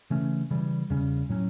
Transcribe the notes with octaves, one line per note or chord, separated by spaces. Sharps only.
C#3 E3 A3 C#4
C#3 E3 G3
E2 C#3 G3 C#4
A2 F#3 C#4